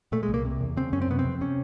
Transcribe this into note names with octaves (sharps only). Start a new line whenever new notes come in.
A#2 A3
G#3
C2
A#3
C3
E2
C#3 C4
F#2 C#4
C4
C3 B3
C4
F2
C3 C#4